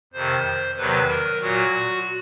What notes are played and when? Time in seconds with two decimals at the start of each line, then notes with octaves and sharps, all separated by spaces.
0.13 F2 C3 D#3 C5
0.77 E2 C3 D#3 F#3 B4
1.09 A#4
1.41 A#2 F#3 F#4